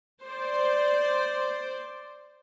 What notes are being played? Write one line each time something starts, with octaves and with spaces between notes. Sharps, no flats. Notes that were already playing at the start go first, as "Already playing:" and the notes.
C5 D5